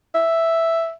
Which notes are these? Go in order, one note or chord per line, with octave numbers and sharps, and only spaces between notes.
E5